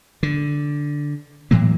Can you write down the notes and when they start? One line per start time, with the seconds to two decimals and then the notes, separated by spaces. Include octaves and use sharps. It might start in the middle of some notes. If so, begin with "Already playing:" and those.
0.23 D3
1.51 A2 E3 F#3 A#3